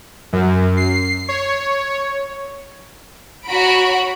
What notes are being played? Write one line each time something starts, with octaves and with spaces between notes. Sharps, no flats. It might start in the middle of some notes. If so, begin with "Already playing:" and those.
F#2
C7
C#5
F#4 C#5 A#5 B5 D7